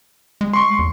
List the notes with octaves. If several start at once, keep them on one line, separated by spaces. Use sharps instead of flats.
G#3
C6 C#6
E2